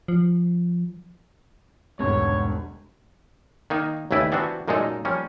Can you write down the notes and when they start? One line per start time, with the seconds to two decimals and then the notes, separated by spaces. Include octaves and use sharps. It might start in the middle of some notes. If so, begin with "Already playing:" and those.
0.08 F3
1.99 E1 C2 G#2 D3 C#5
3.70 D#3 A#3 D#4
4.11 A1 D#2 C#3 E4 B4 D5
4.32 E3 B3 C4 D4 F#4
4.68 F#2 A#2 G#3 A#3 D#4 A4
5.05 F3 G3 A#3 C#4